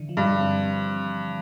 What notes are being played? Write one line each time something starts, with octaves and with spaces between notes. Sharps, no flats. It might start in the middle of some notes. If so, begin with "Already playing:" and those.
Already playing: D3 E3
F3
G2
D3
C4